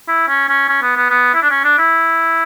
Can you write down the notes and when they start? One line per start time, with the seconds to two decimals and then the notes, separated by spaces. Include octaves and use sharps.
0.08 E4
0.29 C#4
0.49 C#4
0.69 C#4
0.82 B3
0.97 B3
1.10 B3
1.34 E4
1.42 D4
1.50 C#4
1.64 D4
1.78 E4